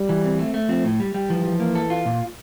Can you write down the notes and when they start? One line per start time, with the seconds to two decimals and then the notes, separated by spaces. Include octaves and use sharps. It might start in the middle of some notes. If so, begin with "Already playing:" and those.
Already playing: G3
0.09 E3
0.24 C4
0.39 A3
0.54 A3
0.69 F3 C4
0.84 A2
1.00 G3
1.14 G3
1.30 E3 F3
1.45 F3
1.60 A#3
1.75 A4
1.90 F4
2.05 A#2